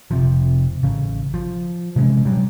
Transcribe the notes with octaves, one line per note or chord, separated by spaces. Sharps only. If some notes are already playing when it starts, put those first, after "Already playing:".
F1 C3 F3
A1 C#3
F3
C3 E3 G#3 C#4
G2 B2 F#3 G3